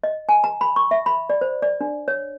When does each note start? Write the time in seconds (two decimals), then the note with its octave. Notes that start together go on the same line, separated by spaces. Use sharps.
0.04 D#5
0.29 G#5
0.44 A#5
0.61 B5
0.76 C#6
0.91 E5
1.06 B5
1.30 D5
1.41 C5
1.62 D5
1.81 D4
2.08 C#5